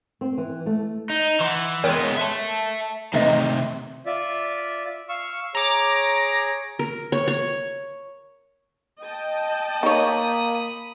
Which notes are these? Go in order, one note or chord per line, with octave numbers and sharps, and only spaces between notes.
C4
E3
A3
D#4
E3 F#5 C6
G#3 B3 A#4 C#5 G5
E5 A5
C3 D#3 E3 A3 D#5
F4 D5 E5
F5 C#6 E6
G#4 C#5 A#5 D6
A#4
C#5
C#5
D#5 G5 A5
A#3 D#4 C#5 B5 D#6